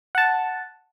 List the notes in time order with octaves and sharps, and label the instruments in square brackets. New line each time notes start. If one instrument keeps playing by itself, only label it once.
[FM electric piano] F#5 A5